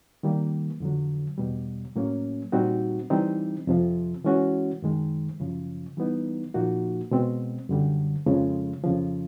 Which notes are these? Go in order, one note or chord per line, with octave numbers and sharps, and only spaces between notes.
D#3 G3 A#3
F2 D3 F#3
E2 B2 G3
A2 F#3 A#3 C#4
A#2 G3 C4 D#4 F#4
E3 G3 C4 D#4
F2 C3 F3
E3 G#3 C#4 F#4
F#2 D#3 G#3
F#2 C#3 F3
E3 G3 B3 D#4
A#2 F3 A#3 D#4 F#4
B2 G#3 C4
F#2 D3 G3
F2 C#3 F3 G#3
F2 C#3 F3